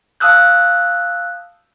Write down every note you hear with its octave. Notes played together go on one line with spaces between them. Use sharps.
F5 A5 D#6 E6 F#6 G6